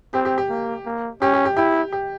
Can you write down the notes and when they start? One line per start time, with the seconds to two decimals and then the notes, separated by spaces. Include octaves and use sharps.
0.14 C4 G4
0.25 G4
0.38 G4
0.50 A#3
0.86 A#3
1.21 C#4 G4
1.34 G4
1.45 G4
1.57 E4 G4
1.92 G4